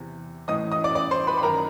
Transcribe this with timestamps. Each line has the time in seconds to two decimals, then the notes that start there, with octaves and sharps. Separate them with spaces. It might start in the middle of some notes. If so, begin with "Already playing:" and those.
Already playing: E2 C3 E3
0.48 A2 E3 D#5 D#6
0.71 D#5 D#6
0.84 D5 D6
0.95 D5 D6
1.11 C5 C6
1.27 B4 B5
1.38 B5
1.43 F#2 D#3 A#4 A#5